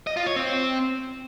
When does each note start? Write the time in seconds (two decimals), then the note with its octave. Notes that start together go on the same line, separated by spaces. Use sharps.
0.07 D#5
0.17 F4
0.26 C#5
0.36 C4